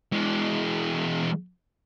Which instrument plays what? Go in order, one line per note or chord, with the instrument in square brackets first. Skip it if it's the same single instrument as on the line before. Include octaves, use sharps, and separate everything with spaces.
[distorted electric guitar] E3 G#3